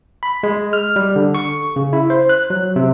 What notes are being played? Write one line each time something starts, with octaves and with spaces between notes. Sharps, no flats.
B5
G#3
F6
G3
D3
C#6
C#3
E4
C5
F#6
F#3
C3